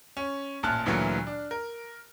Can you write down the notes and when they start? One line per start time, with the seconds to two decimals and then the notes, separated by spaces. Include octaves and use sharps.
0.17 C#4
0.63 A1 A#2 A5 F6 F#6
0.86 D2 A#2 E3 F#3 A3
1.27 D4
1.51 A#4